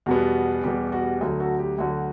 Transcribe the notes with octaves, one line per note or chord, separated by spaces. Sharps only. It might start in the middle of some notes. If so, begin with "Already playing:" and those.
E2 B2 G3 B3 F#4
E2 B2 G3 B3 G4
G4
F#4
D2 D3 F#3
F#4 A4
G4
D2 D3 F#3 F#4